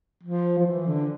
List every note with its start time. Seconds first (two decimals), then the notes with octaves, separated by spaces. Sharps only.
0.24 F3
0.59 F3
0.66 E3
0.87 D3